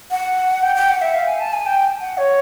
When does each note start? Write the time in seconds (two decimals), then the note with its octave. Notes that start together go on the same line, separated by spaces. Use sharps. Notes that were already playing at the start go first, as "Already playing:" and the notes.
0.11 F#5
0.63 G5
0.76 G5
0.89 F#5
1.01 E5
1.14 F5
1.27 G#5
1.40 A5
1.53 G#5
1.66 G5
2.00 F#5
2.17 C#5